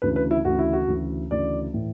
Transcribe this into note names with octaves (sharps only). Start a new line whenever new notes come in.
D2 C#3 E3 B4
B4
E4
D2 C#3 E3 F#4
E4
F#4
D2 C#3 E3
D2 C#3 E3 D5
A2 E3